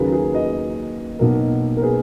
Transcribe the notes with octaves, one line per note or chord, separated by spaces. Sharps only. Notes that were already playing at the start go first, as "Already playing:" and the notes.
Already playing: D#2 C#3 F#3 A#3 G#4 B4
G#4 B4
B4 D#5
B1 B2 A#3
A#4
G#4 B4